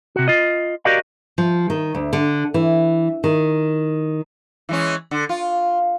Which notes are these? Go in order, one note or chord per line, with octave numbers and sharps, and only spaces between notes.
C3 F#4
F4 D#5
F#4 G4 A#4 D5 D#5 F5
F3
D#3
D2
D3
E3
D#3
E3 G#3 C#4
D3
F4